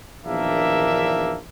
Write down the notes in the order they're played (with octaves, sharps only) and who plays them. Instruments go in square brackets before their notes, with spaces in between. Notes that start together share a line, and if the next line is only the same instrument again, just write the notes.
[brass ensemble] A#1 E2 D#3 A#3 D4 E5